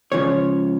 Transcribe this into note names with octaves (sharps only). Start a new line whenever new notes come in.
C#2 C#3 F3 C#5